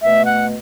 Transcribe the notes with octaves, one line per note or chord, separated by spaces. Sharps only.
B2 A3 E5
F#5